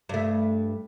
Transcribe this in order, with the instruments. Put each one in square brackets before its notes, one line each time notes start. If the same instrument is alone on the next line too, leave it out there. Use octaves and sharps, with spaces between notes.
[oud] G2 A3